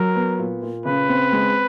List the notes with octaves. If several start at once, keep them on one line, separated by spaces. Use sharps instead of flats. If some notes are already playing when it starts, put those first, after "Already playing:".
Already playing: F#3 A#4
B3
A#2
A#2
C#3 B4
C4
G#3